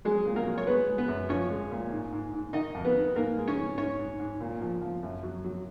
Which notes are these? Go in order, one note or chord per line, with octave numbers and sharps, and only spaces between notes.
F#3 G#3 G#4
A#2
A#3 A#4
F#3
C#5
G#3 B3 B4
G#3
B3 B4
F#2
F3 C#4 C#5
G#3
A#2
G#2
G#2
G#2
D#3 D#4 D#5
F2
B3 B4
D#3
G#2 A#3 A#4
G#3
C#4 C#5
G#2
G#2 C#4 C#5
G#2
G#2
A#2
F3
F3
F#2
F#3
F#3